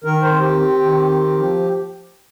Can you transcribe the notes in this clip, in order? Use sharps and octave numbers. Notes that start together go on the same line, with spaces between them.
D#3 A#4
C5
C4
G4
C4
D#3
C4
F3